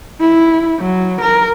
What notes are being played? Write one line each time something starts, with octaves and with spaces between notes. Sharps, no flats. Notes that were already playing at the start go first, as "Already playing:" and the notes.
E4
F#3
A#4